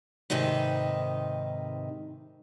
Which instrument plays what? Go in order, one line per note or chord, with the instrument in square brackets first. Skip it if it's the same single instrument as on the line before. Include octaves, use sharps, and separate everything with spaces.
[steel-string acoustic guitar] G#2 C3 D#3 D#4 B4